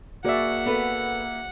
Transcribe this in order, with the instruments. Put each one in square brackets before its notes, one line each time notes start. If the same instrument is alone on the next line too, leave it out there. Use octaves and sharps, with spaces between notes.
[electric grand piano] A#3 E5 [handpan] F#4 G#4 D5 [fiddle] F#5
[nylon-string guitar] B3 A4 B4